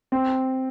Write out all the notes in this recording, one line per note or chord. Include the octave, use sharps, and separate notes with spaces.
C4